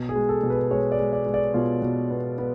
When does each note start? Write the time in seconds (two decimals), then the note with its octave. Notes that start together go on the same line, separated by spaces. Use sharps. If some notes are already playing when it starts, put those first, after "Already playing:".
Already playing: B2
0.09 G#4
0.16 G#3
0.29 A4
0.43 B2
0.50 B4
0.71 G#3 C#5
0.92 D5
0.99 G#3
1.13 D5
1.27 G#3
1.34 D5
1.54 B2 F4
1.82 B2
2.10 B3
2.38 B3